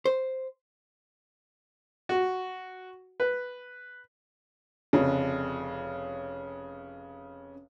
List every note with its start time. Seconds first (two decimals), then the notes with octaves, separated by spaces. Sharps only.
0.06 C5
2.09 F#4
3.20 B4
4.93 F1 C#3